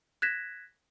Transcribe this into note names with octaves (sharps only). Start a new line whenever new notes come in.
F#6 G#6 A#6 B6 E7